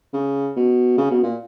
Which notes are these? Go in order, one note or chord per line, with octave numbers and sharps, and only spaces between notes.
C#3
B2
C#3
B2
A#2